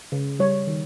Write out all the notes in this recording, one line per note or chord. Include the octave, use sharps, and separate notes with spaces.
C#3
G3 C#5
D#3